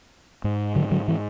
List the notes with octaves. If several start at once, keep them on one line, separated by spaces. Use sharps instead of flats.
G#2
D3 F#3
D3 F#3
E3